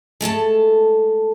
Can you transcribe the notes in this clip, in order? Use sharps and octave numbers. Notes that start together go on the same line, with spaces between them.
G#3 A3 A4 A5